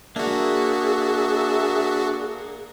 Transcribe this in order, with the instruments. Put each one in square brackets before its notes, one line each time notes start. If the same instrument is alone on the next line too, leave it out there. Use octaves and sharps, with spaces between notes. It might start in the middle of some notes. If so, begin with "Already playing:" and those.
[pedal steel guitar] A#3 [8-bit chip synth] D4 F#4 [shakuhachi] G#4 [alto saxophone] E5